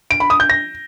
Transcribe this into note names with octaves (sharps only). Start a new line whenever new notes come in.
D7
B5
D#6
G6
A#6